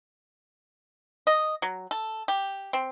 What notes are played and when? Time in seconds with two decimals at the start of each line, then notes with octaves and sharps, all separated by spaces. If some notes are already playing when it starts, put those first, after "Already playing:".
1.27 D#5
1.62 F#3
1.91 A4
2.28 G4
2.73 C4